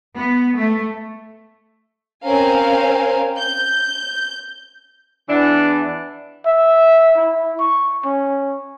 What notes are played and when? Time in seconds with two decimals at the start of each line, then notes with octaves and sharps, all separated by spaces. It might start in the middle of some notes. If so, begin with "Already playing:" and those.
0.16 B3
0.56 A3
2.25 C4 C#4 A#4 C5 F5 G#5
3.38 G6
5.29 E2 E3 D4
6.46 E5
7.17 E4
7.59 C#6
8.05 C#4